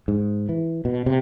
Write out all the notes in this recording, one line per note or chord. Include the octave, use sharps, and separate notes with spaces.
G#2
E3
B2
C3